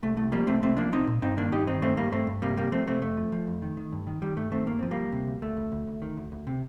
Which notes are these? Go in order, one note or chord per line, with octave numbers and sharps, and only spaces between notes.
C2 A3
C2 A3
F3 G3 A#3
C2 A3 C4
C2 A3 C4
F3 A#3 D4
C2 C4 D#4
A#2
G2 C4 D#4
D#3 A#3 D4
G2 D#4 G4
D#3 C4 D#4
G2 A3 C4
G2 G3 A#3
G2 A3 C4
G2
C3 G3 A#3
C3 G3 A#3
F3 A3 C4
C3 A3 C4
F2 A3
F3
F3
F2
D#3
D#3
G2
D#3
D#3 G3
G2 A3
D#3 A3 C4
G2 A#3
F3 C4
G3 A#3
D2
C3
D2
D2 A3
D2
D2
D2
D#3
D2
D2
C3